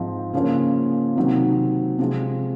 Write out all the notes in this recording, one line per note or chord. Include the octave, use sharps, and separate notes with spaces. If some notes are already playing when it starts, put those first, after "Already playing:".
Already playing: G#2 F3 C4 D#4
C#3 F3 A#3 C#4
C3 D#3 F#3 C4 D#4
C3 F3 G#3 C4